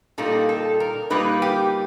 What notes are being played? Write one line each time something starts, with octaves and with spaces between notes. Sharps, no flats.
A#2 G3 A#3 D#4 A4
A4
A#4
A#2 G3 A#3 D#4 B4
G4